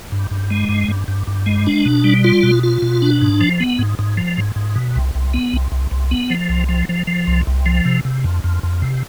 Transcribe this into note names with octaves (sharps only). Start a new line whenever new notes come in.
G2
G2
G#3
G2
G2
G2
G2
G#3
D4
B2
G3
F4
B2
F4
B2
D4
G#2
F3
B3
G#2
G#2
F3
G#2
G#2
B2
C2
C2
B3
C2
C2
C2
B3
F3
C2
F3
F3
F3
C2
C2
F3
C3
C3
F2
F2
F2
C3